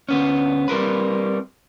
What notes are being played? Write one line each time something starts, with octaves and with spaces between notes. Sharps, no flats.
D2 B3 C#4
G3 C4 A#4 B4